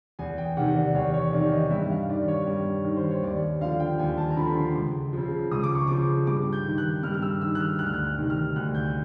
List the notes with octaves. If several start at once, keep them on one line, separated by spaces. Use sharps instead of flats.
E2 G#5
G5
C3 D#3 F#5
D5
E2 C#5
C#5
C3 D#3 D5
D#5
G2 E5
F5
D#3 D5
C#5
G2
D#3
C5
C#5
D#2 D5
D3 F3 F5
G5
D#2 G#5
A5
A#5
D3 F3 B5
C6
C#2
C#3 F3
C#2 D#6
D6
C#6
C#3 F3 D6
G2 D6
G6
D#3
F#6
G2 F6
F6
E6
D#3 E6
F#6
F6
D2 F#6
F6
F#6
F#6
C3 D#3
F6
D2 F#6
G6